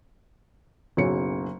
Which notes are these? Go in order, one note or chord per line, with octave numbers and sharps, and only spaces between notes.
F#1 B1 C#3 F#3 C#5 C#7